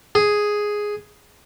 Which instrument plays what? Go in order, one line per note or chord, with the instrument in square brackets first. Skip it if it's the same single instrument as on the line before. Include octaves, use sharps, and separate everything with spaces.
[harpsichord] G#4